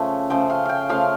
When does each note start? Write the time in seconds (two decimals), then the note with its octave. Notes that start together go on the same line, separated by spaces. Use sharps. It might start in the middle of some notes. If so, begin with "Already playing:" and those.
Already playing: C#3 F3 A3
0.30 C#3 F3 A3 G5
0.50 F5
0.65 F5 G5
0.89 C#3 F3 A3 F5